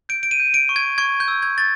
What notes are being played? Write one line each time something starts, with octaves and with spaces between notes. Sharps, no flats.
G6 D7
D7
D#7
G6
D7
C#6
G#6
C#6 G#6
G6
E6
G#6
C#6 A6